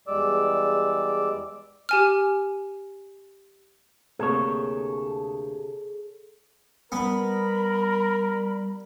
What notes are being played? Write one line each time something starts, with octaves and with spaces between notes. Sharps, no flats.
E2 G3 G#3 D5 D6 E6
G4 G#5 F6
D2 C3 A#3 G#4 A4 C#5
G3 B3 A#4 B5